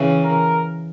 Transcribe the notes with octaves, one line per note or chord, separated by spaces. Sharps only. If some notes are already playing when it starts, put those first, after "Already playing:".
Already playing: C#3 E3
A#4